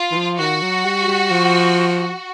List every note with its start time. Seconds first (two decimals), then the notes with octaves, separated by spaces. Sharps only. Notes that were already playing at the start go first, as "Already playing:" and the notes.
Already playing: F4
0.11 E3
0.17 F3
0.39 D#3 F#4
0.62 F#3
0.85 G3
1.08 G3
1.31 F3